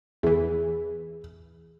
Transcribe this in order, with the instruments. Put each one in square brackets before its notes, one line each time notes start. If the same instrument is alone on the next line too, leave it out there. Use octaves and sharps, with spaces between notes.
[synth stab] E2 E3 [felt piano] G#4